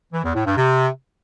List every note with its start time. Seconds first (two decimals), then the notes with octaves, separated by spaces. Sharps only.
0.13 E3
0.24 E2
0.35 A2
0.46 G2
0.57 C3